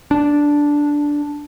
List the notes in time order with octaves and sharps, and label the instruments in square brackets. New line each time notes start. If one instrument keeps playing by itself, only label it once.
[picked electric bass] D4